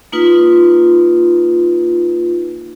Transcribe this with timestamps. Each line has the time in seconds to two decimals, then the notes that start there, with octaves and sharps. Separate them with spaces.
0.12 A#3 D#4 F4 B4